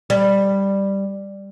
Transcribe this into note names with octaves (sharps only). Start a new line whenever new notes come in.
G3